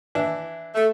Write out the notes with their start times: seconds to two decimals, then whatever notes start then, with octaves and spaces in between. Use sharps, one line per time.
0.15 E3 D4 E4
0.75 A3